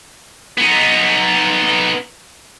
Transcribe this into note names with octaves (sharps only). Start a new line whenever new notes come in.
B3 D#4